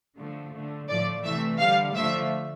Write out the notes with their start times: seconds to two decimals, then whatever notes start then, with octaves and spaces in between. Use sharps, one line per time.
0.18 D3 F3 A3
0.53 D3 A3
0.89 A2 F3 A3 D5
1.24 C3 E3 A3 E5
1.59 D3 G3 F5
1.95 D3 F3 A3 E5